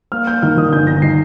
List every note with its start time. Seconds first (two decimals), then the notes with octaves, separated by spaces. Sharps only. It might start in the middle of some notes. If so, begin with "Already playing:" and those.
0.12 A#3 F6
0.27 A#3 G6
0.42 D#3 F6
0.57 D#3 D#6
0.72 G1 G6
0.87 D#3 A#6
1.02 D#3 C7